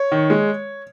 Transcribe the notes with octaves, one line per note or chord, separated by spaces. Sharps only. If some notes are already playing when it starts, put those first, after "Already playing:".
Already playing: C#5
D#3
G#3